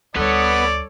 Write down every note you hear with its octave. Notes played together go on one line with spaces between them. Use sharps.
D2 G3 B3 A4 B4 C#5 D5